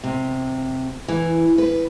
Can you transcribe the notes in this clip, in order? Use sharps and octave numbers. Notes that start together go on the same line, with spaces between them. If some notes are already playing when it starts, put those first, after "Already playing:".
C3
E3
B4